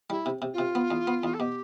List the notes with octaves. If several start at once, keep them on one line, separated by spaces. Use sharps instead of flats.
G3 E4
C3
C3
F4
C3
B3
E2
B3
E2
A4
B2 G4